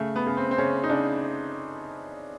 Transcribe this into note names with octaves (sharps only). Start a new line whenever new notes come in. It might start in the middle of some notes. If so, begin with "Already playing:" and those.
Already playing: C#3 A3
B3
C#3
C4
C4
C#3 C#4
D#4
C#3 D4